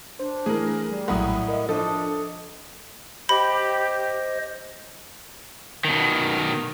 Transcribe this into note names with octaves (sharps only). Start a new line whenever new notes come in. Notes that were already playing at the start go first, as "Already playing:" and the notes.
D4 C5
E3 A3 G#4 A#4
G3
A#1 A2 F#3 E4 F#5 A#5 D#6
A#4 D#5 E5
F3 D4 A4 D#5 D#6
G4 C5 D#5 B5
B2 D#3